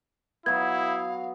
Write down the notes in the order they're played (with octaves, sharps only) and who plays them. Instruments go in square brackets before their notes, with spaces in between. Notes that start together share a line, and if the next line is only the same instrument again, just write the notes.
[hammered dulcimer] F#3 B3 [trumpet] E4 [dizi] F5 [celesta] G#6